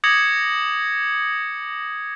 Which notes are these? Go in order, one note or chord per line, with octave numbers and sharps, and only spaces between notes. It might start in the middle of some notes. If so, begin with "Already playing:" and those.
D6 D#6 G#6 A#6 C#7 F#7